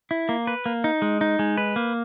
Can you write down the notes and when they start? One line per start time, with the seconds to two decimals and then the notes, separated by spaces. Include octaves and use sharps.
0.11 E4
0.29 A#3
0.47 B4
0.66 A#3
0.84 D#4
1.02 G#3
1.21 D#4
1.39 G#3
1.58 B4
1.76 A#3